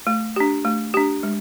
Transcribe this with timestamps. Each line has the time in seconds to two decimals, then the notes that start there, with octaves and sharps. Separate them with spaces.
0.07 A3
0.36 D4 G4
0.65 A3
0.94 D4 G4
1.23 G#3